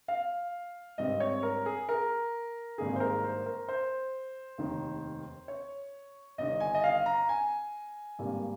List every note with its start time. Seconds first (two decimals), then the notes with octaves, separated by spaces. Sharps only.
0.08 F5
0.98 G#1 G2 G3 C4 D#5
1.20 C#5
1.43 A#4
1.66 G#4
1.89 A#4
2.78 G#1 G2 D#3 A#3 G#4
2.96 C5
3.00 A#4
3.24 C5
3.46 A#4
3.68 C5
4.58 F1 D#2 D#3
5.48 C#5
6.38 G1 G2 D#3 D#5
6.60 G#5
6.74 D#5
6.84 F5
7.06 A#5
7.29 G#5
8.19 G#1 G2 G3 A#3